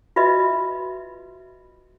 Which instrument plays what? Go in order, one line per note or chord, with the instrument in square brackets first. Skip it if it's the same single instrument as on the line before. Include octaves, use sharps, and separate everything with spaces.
[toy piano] F4 F#4 B4 D#5 E5